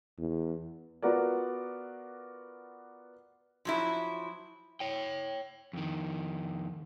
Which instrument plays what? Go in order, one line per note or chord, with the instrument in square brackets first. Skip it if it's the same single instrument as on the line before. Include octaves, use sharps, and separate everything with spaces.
[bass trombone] E2
[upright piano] B3 F4 F#4 A#4 D5
[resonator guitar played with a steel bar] F3 F#3 E4
[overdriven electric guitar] C#5 G5
F2 D#3